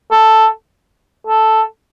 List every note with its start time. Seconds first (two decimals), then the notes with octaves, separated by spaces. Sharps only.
0.11 A4
1.27 A4